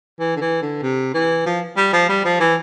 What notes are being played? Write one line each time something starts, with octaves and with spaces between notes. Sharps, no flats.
E3
D3
E3
D3
C3
E3
F3
G3
F3
G3
F3
E3